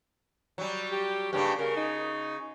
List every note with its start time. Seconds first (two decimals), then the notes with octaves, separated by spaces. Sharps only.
0.58 F#3 G3
0.92 G4
1.33 G2 C#3 A#3 G4
1.59 C#3 A#4
1.77 D#4